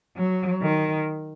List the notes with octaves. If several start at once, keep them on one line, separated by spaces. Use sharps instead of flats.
F#3
D#3